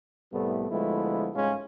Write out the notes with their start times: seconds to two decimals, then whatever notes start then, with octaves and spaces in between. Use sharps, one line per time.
0.33 C2 A2 G3 A3 B3
0.71 D2 F3 G#3 A3 B3 E4
1.35 C2 G#2 G#3 C#4 F4